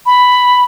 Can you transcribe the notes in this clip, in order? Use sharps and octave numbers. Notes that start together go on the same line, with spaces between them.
B5